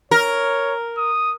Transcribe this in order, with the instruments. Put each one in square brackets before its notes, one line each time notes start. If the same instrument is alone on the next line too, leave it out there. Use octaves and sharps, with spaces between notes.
[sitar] A#4 [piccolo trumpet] C#5
[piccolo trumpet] D#6